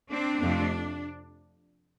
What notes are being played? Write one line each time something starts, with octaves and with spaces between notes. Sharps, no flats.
C4 D4
F2 C3 F3 A3 C4